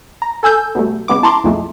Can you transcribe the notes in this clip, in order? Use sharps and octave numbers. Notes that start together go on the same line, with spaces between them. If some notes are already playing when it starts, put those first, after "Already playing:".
A#5
A4 G#5 E6 G6
B2 F#3 G3 A3
C#3 G#3 B3 D6
E4 A5 A#5 C6 D6
B1 F2 F3 G#3 A3